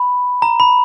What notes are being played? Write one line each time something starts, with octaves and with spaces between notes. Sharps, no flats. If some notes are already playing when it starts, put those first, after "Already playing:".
Already playing: B5
A#5
B5